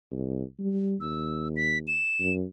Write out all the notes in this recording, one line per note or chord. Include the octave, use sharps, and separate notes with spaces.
C2
G3
D#2 E6
B6
E7
F#2